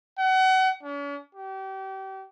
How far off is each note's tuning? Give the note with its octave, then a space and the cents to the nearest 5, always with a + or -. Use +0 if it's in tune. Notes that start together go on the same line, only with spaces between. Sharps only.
F#5 +30
C#4 +45
G4 -30